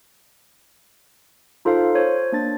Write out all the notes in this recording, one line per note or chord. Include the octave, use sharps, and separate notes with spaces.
D#4 F4 A4 C5 F5
C5 C#5
A#3 D4 A6